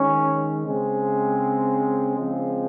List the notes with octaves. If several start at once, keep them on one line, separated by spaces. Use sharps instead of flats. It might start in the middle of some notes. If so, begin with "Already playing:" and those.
Already playing: D#3 G#3 C#4
C#3 G#3 C4
C#3 F3 G#3 C4